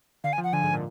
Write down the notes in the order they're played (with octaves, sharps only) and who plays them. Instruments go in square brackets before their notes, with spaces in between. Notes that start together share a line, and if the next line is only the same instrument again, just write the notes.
[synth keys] D3 [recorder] F5
[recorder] G#5
[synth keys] F3
[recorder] F#5
[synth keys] D3 [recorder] G#5
[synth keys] G#2
A#2